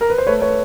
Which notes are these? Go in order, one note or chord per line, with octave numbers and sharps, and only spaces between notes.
A#4
B4
C5
A3 B4 C#5
B4 C#5